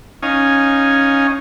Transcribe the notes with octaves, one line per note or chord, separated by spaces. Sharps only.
C#4 D#4 F5 G#5